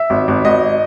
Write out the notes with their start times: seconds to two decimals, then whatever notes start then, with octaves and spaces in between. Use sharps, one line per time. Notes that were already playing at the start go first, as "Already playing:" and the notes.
Already playing: E5
0.10 G#1
0.28 G#1
0.45 G#1 D#5